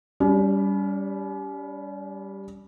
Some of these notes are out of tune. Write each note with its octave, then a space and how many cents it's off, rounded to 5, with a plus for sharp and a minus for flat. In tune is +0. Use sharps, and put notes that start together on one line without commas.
G3 +0 C#4 +40